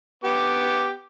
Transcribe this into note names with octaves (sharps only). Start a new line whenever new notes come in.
B3 G4 D6